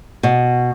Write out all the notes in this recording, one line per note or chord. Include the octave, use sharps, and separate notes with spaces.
B2